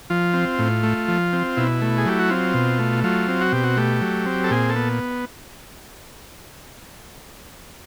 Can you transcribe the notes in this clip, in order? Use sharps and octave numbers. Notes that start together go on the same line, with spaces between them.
F3 F4
C4
A2
A3
F3
C4
B2 E4
A3
G#4
F#3 G4
F#4
C4 F4
B2
A3
F#3 F4
C4
F#4
B2 G4
F#4
A3 G4
F#3
C4
A4
A#2 G#4
A4
B3